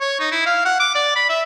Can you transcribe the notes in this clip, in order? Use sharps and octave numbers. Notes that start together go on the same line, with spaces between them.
C#5
D#4
E4
F5
F#5
D6
D5
B5
E5